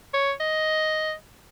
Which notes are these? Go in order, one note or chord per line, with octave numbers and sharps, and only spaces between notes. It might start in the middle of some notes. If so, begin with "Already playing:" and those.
C#5
D#5